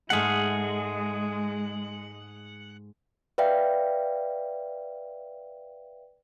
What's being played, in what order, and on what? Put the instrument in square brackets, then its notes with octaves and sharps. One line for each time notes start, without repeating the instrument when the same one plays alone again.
[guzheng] G#2 A3 F5 [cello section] G#3 [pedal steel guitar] G#4 F#5
[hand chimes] B4 D5 E5 F5 G5